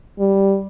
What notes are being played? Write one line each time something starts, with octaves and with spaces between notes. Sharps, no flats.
G3